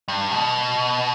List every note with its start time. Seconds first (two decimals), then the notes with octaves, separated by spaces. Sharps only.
0.08 G2
0.31 B2